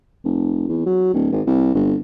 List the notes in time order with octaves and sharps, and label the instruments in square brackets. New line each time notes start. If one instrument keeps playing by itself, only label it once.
[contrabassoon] F1
E2
F#3
D1
G#1
C2
G1